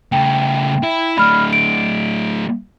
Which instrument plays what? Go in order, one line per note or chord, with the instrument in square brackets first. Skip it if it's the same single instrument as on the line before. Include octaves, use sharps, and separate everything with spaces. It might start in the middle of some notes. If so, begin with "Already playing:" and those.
[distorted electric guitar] C#3 A3 [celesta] G5
[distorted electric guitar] E4
[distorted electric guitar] A2 D4 [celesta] B5 F6
[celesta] D7